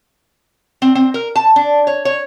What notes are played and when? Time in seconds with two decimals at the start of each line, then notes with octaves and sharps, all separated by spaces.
0.82 C4
0.95 C4
1.14 A#4
1.36 A5
1.56 D4
1.87 C#5
2.05 C#5